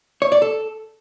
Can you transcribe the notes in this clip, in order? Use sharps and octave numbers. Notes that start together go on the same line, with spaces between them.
C#5
D5
A4